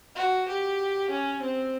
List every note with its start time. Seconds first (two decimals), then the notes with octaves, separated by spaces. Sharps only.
0.16 F#4
0.48 G4
1.10 C#4
1.41 C4